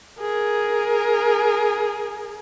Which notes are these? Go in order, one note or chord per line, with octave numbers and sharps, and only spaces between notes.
G#4 A#4